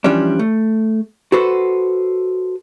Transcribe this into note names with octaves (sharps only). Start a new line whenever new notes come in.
E3 F3 G3 C#4 D4
A3
F#4 A4 B4 C5